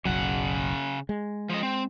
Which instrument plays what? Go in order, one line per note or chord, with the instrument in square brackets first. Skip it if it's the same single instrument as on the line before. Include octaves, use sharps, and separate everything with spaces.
[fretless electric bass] F#1 B1 F#3 [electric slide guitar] C#3 F#5
[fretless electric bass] G#3
[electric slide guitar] F3 D#5
C4